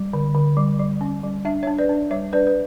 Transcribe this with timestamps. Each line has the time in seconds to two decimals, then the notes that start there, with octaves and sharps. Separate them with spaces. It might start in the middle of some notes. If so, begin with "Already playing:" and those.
Already playing: G3
0.13 D3
0.35 D3
0.57 G3
0.79 G3
1.01 C#4
1.23 G3
1.45 D4 E5
1.63 D4 C#5 E5
1.78 B4 D5
1.89 D4
2.11 G3 C#5 E5
2.33 D4 B4 D5
2.47 B4